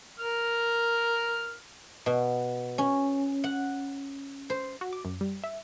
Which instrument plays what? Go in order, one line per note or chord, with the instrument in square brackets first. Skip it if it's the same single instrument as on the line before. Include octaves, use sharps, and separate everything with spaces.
[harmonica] A#4 F6
[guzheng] B2
C#4
F#5
C5
[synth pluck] F#4
D6
F#2
G3
E5